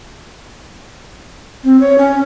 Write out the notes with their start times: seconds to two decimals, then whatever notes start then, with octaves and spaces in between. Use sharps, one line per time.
1.64 C4
1.81 C#5
1.98 C#4